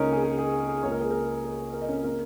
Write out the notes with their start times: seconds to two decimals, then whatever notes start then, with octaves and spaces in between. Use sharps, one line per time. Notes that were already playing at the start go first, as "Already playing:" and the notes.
Already playing: C#2 C#3 A#3 C#4 D#4 A#4 C#5
0.12 G#4
0.24 G#4
0.38 G#4
0.68 G#4
0.83 C#2 C#3 A#3 C#5
0.92 A#4
1.01 G#4
1.10 A#4
1.44 G#4
1.73 A#4
1.82 D#5
1.88 C#4 C#5
2.04 C#3 A#3 A#4